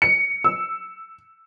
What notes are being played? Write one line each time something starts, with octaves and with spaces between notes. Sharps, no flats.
C#7
E6